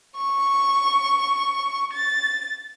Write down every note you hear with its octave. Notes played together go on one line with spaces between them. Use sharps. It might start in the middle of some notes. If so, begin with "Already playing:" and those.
C#6
A6